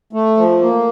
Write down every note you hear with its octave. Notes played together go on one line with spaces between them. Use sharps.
A3
F3
A#3